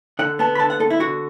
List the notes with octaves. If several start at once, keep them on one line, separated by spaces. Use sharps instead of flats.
D3 F#5
B3 A5
B5
D3 A5
F#5
B3 A4
E4
D3 F#4